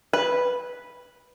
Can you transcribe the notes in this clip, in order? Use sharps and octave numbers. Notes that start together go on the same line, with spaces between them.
B4